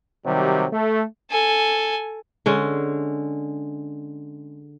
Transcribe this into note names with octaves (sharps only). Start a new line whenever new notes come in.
C3 D#3 F#3 G3
A3
A4 G#5
D3 G#3 C#4